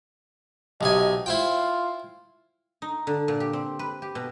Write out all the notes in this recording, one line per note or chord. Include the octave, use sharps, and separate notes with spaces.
B1 C3 D#5 G#5
E4 F4 C5 G5
D#4
D3
A#2
G4
C4
B4
G4
B2